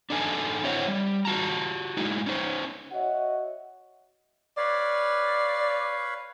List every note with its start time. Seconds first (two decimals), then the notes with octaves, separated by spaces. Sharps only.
0.10 D4 D#4 A4 G#5
0.64 C4 E4 C5 C#5 F#5
0.88 G3
1.25 F4 F#4 A5 A#5
1.97 G#3 D#4 E4
2.26 C#4 D#4 C5
2.92 F#4 C#5 D#5 E5 F#5
4.57 B4 C#5 D5 F5